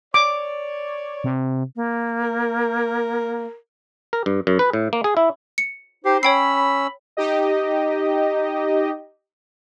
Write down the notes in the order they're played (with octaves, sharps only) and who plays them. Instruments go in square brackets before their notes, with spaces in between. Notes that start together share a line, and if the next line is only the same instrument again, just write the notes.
[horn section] C#5 D5 [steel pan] D6
[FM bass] C3
[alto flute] A#3
[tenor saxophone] A#4
[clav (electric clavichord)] A#4
G2
F#2
B4
A2
A#3
G#4
E4
[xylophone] C#7
[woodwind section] D#4 C5 [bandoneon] G4
[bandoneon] C#4 E6 [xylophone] C#5 G5 C7 [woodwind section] B5
[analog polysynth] D#4 G4 D#5